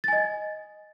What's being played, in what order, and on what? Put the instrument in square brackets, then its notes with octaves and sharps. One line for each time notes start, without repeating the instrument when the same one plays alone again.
[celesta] A6
G#5
D#5